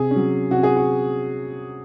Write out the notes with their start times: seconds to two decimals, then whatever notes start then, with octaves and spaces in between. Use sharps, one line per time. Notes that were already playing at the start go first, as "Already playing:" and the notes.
Already playing: C3 G#4
0.11 C#4
0.16 F#3
0.51 C3 F#4
0.63 G#4
0.77 F#4